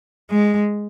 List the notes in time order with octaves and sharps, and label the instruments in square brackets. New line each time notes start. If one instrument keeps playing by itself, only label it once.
[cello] G#3